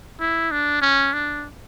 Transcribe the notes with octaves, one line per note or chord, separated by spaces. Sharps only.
E4
D4
C#4
D4